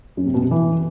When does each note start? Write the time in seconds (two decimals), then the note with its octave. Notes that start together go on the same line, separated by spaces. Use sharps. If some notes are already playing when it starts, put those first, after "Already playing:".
0.17 F#2
0.26 C3
0.34 B2
0.43 C3
0.51 E3